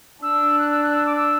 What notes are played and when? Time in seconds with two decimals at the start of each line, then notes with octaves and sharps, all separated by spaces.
0.23 D4 E6
0.59 F#6
0.71 E6
0.83 F#6
0.95 E6
1.06 D6
1.16 E6